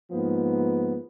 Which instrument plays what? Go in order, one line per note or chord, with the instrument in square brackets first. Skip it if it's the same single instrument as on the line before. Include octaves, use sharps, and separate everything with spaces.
[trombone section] G#2 F3 A#3 B3